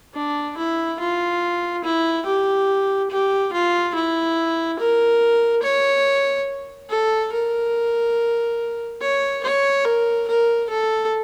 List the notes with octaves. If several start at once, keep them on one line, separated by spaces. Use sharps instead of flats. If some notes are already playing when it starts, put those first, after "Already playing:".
D4
E4
F4
E4
G4
G4
F4
E4
A#4
C#5
A4
A#4
C#5
C#5
A#4
A#4
A4